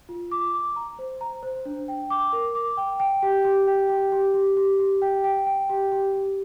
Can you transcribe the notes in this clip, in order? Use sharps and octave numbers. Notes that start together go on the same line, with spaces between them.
F4
D6
D6
A#5
C5
A#5
C5
D4
G5
D6
A#4
D6
G5
G5
G4
G4
G5
G4
G4
G4
G4
G4
G5
G5
G5
G4
G4
G4